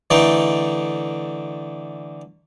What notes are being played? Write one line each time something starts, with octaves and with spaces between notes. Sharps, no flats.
D3 E3 A3 D#4 G5